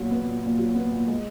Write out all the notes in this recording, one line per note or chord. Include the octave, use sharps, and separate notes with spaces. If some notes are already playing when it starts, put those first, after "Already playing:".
Already playing: A#2 F#3
B3
A#2
A#2
F#3
B3
A#2
G#3